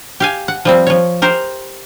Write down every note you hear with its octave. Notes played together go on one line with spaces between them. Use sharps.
G4 F5 G#5
F#5
F3 G3 C4
F3 C#5
G4 A#4 C5